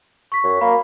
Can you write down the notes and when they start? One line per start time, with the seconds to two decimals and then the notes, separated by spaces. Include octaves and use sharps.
0.32 C#6 B6
0.44 F#2
0.61 A#3 B5